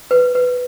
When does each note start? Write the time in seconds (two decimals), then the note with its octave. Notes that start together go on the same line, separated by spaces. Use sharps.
0.11 B4
0.35 B4